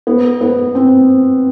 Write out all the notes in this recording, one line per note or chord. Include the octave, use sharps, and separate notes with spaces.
B3
B3
C4